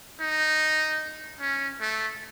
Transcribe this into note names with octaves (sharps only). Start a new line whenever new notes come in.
D#4
C#4
A3